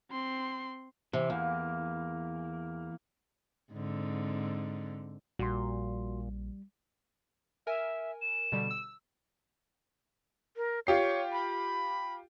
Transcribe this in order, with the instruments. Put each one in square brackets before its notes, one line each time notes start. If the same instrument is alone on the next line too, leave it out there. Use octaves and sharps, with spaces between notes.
[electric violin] C4 C6
[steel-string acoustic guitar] C3 [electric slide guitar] E3
[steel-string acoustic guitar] E2 [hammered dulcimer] A#3
[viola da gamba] G#2 D3 C4
[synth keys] A#1 [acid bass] A#2 [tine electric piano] G3 [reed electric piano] F#4 C6
[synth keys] A#4 G#5 [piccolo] E5
[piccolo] E7
[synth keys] B2 D3 G3
E6
[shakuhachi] A#4
[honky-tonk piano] F4 G4 C7 [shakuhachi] C#5
[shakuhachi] B5